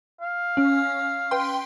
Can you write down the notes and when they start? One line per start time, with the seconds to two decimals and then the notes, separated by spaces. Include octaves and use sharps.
0.21 F5
0.57 C#4
1.31 B4 G5 C6